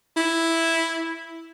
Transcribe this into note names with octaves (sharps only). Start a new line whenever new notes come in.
E4